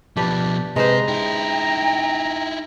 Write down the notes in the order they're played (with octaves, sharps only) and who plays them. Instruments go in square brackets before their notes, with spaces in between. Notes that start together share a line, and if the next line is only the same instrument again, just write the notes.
[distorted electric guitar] B2 F3 [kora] D4 G4 B4
[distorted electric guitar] C3 G4 [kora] G#3 C5 [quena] B4 [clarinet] A#5
[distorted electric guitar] D#4 E4 [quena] G5